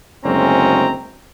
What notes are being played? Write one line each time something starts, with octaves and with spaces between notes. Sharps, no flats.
F#1 D2 G#3 C4 C#4 A#5